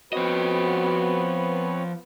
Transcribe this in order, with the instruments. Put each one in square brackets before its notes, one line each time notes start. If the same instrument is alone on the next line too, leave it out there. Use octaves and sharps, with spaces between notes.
[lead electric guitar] F3 D#5 [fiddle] B3 [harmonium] C4 B4 C#5 [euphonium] F#4